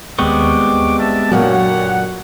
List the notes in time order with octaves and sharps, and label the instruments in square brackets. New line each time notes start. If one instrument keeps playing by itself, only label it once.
[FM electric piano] D#2 C#6 [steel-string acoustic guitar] G3 [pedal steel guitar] G#3 B3 C4 [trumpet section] D6
[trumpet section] D4 E5 A5
[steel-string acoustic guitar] F#2 A#2 D3 [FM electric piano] F#3 [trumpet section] G4 C#5 F#5